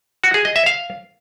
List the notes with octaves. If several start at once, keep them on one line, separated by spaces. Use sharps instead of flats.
F#4
G#4
D#5
E5
F5